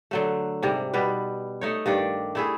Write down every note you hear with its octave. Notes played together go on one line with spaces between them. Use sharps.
D3 F#3 A3
G#2 C3 G3
B2 G3 B4
A3 D#4 C#5
G2 D#3 D4 D5
A3 E4 G#4